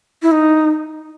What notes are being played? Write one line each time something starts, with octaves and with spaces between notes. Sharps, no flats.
E4
D#4